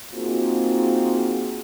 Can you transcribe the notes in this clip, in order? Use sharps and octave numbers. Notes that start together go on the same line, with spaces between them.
A#3 C4 D#4 F4 F#4 G#4